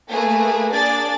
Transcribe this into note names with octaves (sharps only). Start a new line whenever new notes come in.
A3 A#3 G#4 B4
A#3 D4 G#4 D5 A6